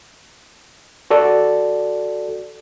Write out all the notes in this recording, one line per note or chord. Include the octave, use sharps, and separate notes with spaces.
F#4 A4 D5